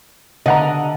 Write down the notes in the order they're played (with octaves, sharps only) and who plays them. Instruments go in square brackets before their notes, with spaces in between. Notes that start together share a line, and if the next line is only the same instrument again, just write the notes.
[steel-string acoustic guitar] D3 [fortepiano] D#5 F#5 A#5